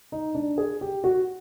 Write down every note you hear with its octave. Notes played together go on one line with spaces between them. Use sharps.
D#4
D4
G#4
G4
F#4